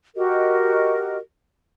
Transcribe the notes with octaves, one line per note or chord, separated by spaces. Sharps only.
F#4 G4 A#4 D#5